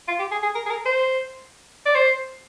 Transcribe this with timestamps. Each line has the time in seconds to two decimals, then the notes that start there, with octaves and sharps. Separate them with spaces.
0.08 F4
0.19 G4
0.31 G#4
0.43 G#4
0.55 A#4
0.66 G#4
0.70 A#4
0.86 C5
1.86 D5
1.95 C5